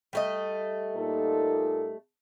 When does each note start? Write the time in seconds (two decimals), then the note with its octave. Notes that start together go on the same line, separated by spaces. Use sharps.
0.13 G3 A3 D#5
0.96 A#2 D#4 A4